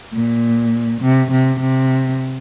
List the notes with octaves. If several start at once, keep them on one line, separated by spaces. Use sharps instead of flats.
A#2
C3
C3
C3